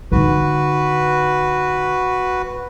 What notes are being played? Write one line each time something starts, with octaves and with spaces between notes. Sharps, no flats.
D3 D#4 F#4 B4